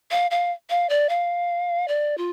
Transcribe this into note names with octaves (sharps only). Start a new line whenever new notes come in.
F5
F5
F5
D5
F5
D5
F4